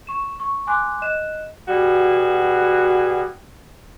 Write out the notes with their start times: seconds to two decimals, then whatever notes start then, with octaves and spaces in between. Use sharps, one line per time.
0.07 C#6 E7
0.40 C#6
0.67 G#5 C6 D6 F#6
1.02 D#5 F#6 E7
1.68 B2 G3 F#4 G#4